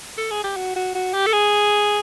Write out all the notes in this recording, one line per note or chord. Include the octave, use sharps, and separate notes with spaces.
A4
G#4
G4
F#4
F#4
F#4
G4
A4
G#4